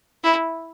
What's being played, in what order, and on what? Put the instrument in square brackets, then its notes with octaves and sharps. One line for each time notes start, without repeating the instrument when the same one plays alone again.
[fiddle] E4